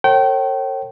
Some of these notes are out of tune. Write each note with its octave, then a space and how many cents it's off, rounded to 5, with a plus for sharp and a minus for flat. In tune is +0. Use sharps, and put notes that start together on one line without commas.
A#4 -45 C#5 -40 G5 -30